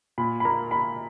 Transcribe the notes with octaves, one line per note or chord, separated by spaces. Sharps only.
A#2 B5
B5
A#3 A#5
A#3 B5